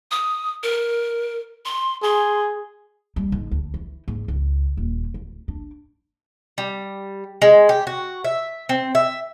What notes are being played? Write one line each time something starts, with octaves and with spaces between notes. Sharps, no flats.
D#6
A#4
C6
G#4 C6
G3
G#2
D2
E3
G#2
C#2
D#1
D1
D4
G3
G#3
G4
F#4
E5
C4
E5